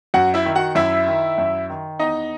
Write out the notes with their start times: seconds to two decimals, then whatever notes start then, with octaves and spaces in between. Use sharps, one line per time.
0.14 F#2 F#4 F#5
0.34 E4 E5
0.45 D#3
0.55 F#4 F#5
0.75 F#2 E4 E5
1.07 D#3
1.38 F#2
1.69 D#3
1.99 E2 D#4 D#5